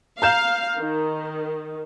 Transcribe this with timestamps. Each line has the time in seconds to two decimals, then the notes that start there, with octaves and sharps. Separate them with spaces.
0.22 F5 A#5 G6 E7
0.78 D#3